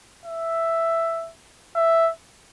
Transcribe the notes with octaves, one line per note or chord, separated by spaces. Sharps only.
E5
E5